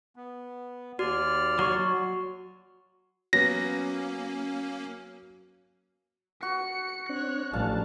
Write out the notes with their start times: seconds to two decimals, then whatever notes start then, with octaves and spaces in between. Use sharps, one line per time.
0.16 B3
0.99 D#2 F#4 D5 F6
1.59 F#3 F#4 C#6
3.33 F#3 A#3 B3 C#4 A#6
6.43 F#4 C#7
7.09 C4 D4 C#5 F#6
7.53 A1 F3 G3 D4 F5 A5